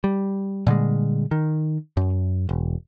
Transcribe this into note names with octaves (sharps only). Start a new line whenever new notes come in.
G3
A#2 D3 G3 G#3
D#3
F#2
E1